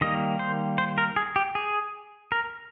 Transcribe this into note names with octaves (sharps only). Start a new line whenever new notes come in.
D#3 G3 A#3 D#5
C5
C5
A#4
G#4
G4
G#4
A#4